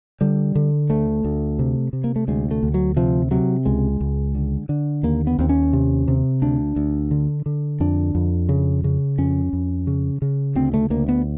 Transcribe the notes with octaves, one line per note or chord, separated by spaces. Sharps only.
D3 G3
D3
D2 A3
D2
C3
C3
A#3
A3
D2 G#3
A3
D2
F#3
C3 F3
C3 F#3
C#2 G#3
C#2
D3
D3
D#2 A#3
B3
D#2 C4
C#4
C3
C3
D2 D4
D2
D3
D3
F2 D4
F2
C#3
C#3
F2 C#4
F2
C#3
C#3
D2 C4
A3
D2 A#3
B3